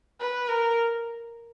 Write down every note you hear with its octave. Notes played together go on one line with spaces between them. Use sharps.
B4
A#4